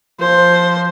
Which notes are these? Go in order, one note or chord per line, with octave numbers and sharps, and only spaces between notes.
F3 C5